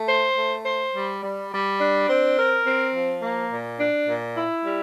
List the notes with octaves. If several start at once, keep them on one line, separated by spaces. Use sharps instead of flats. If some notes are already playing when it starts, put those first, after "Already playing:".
Already playing: A3
C5
A3
C5
G3
G3
G3
D4
C4
A#4
C4
F3
A#3
A#2
D4
A#2
E4
G3